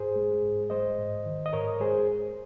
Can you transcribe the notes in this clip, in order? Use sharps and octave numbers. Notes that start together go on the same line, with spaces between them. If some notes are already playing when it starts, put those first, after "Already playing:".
Already playing: G#2 G#4 C5
G#3
G#2
G#3 C5 D#5
G#2
D#3
D#5
G#2 A#4 C#5
G#3 G#4 C5